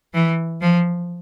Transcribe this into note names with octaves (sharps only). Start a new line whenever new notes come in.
E3
F3